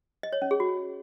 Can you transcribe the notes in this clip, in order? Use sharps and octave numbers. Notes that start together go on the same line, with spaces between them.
D#5
C#5
C#4
G#4
F#4